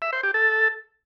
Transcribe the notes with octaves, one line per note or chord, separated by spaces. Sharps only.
E5
C5
G4
A4